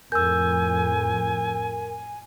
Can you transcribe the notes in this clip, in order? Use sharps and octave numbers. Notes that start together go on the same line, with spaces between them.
F2 A2 A#4 G#5 E6 G6